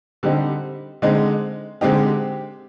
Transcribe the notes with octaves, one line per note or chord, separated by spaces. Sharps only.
D3 G3 C4 D#4
D3 G#3 C4 D#4
D3 G#3 C4 D#4 G4